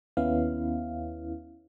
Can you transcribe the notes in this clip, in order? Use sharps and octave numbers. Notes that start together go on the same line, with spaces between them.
D#2 B3 C#4 E4 F5